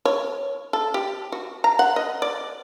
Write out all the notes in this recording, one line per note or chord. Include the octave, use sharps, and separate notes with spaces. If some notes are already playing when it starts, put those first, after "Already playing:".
C#5
A4
G4
F#4
A#5
F#5
D#5
D5